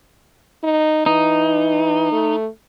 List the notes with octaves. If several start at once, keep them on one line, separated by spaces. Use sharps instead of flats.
D#4
E3 D#4
A3